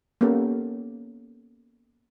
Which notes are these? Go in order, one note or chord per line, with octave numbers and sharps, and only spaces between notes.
A#3 B3 C#4 G4 A4